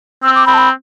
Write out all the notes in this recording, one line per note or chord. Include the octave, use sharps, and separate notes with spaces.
C4 E6
D6
C4 B5
A5
B5